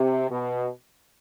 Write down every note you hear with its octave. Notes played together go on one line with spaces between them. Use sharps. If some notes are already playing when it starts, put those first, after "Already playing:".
Already playing: C3
B2